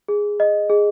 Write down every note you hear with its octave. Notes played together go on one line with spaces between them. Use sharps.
G#4
D#5
G#4